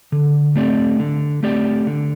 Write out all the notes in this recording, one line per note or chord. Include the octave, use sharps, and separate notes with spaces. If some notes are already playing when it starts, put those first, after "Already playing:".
D3
A3 C4 G4 D5
D3
A3 C4 G4 D5
D3